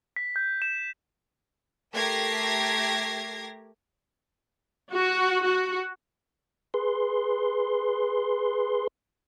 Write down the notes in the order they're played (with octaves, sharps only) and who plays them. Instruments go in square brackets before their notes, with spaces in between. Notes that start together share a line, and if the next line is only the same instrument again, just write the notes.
[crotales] B6
G6
E7
[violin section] A3 G4 A#4 G#6 A#6 C7
[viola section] F#4
F#4
[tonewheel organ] G#4 B4 C6